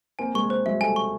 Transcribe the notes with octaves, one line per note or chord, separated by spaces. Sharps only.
A#3 C4 G#5
G#3 A#3 C#6
C5
F#3 G#3 E5
G3 A3 G#5
C#6